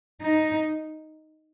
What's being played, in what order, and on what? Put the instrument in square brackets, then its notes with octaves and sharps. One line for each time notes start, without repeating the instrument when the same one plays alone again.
[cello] D#4